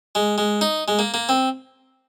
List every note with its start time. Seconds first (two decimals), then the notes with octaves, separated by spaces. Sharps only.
0.15 G#3
0.38 G#3
0.61 D#4
0.88 G#3
0.99 A#3
1.14 A#3
1.29 C4